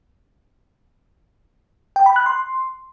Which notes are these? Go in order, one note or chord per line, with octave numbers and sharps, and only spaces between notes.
G5
B5
F#6
C6